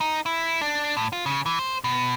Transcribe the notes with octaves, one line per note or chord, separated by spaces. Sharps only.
D#4
E4
D4
A2
F4
C#3
E3
C5
B2